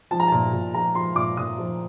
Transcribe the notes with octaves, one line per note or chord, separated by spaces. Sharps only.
F3 A5
A#5
A#2 A5
A#2
F3 A#5
F3 C6
A#2 D6
A#2 D#6
F3